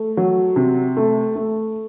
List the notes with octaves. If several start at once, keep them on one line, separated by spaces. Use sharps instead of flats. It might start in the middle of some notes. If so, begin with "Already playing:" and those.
Already playing: A3
F#3
C3
A3
A3